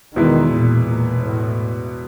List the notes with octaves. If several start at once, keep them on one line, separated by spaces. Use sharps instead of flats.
E2 B2 D#3 G#3 B3 E4
A#2
A#2
A2